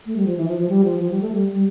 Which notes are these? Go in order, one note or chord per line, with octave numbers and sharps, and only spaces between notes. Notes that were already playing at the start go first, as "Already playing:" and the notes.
A3
G3
F3
E3
F3
F3
G3
F3
F3
G3
A3
G3
G3